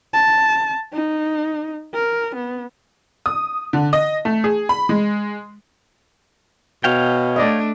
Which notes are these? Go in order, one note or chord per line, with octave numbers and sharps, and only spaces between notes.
A5
D#4
A#4
B3
D#6
D3
D#5
A3
G#4
B5
G#3
B2 C#5 F5 G5
A3 D4 D5 D#5